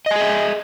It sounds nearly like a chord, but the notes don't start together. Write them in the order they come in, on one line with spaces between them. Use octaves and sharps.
D#5 G#5 G#4 E5